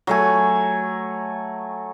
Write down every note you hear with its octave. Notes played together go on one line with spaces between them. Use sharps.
F#3 A3 G#5